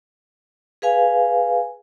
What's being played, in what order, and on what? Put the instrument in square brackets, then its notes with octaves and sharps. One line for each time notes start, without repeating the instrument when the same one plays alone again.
[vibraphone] G#4 B4 F5 G#5